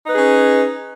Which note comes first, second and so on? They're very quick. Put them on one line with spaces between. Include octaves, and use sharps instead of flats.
D#4 B4 G#4 C#4